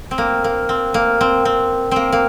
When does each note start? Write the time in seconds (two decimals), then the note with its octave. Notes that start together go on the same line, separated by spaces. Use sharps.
0.11 C4
0.18 A#3
0.44 A#3
0.69 C4
0.94 A#3
1.21 C4
1.45 C4
1.91 A#3 C4
2.12 A#3